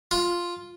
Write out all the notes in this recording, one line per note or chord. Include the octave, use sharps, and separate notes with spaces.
F4